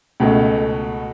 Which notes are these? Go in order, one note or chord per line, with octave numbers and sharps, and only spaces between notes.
C#2 B2 A3